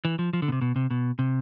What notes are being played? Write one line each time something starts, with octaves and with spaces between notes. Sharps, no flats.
E3
F3
F3
D3
B2
C3
B2
C3
B2
C3